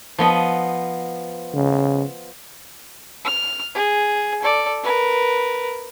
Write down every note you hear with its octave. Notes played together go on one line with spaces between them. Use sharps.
F3 B3 D#5
C#3
F6
G#4
A4 D5
A#4 B4